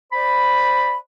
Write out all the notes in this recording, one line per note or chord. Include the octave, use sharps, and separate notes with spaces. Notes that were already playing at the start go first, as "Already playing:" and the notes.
C5 D5 B5